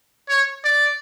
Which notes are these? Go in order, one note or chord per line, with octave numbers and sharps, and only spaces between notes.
C#5
D5